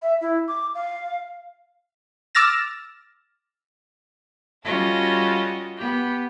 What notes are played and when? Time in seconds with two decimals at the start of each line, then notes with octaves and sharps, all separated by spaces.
0.02 E5
0.21 E4
0.48 D6
0.75 F5
2.35 D6 E6 F6 A6 A#6 E7
4.64 G3 C#4 F4 F#4 A4 D#5
5.77 B3 G4